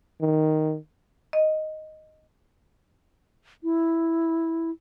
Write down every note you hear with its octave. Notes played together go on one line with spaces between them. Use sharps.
D#3
D#5
E4